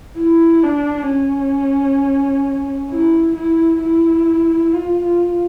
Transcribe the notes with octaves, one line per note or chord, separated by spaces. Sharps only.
E4
D4
C#4
E4
E4
E4
F4
F4